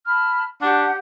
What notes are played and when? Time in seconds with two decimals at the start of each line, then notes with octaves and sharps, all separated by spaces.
0.06 A5 B5 F6
0.62 D4 G4 F#5